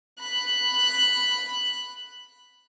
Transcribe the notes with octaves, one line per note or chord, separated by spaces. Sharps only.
B5 F#6